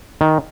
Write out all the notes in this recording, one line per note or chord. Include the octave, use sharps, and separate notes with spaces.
D#3